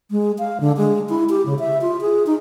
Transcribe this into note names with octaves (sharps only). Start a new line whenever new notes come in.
G#3
F5
D3
G#3
E4
G4
C#3
E5
F4
G#4
D#4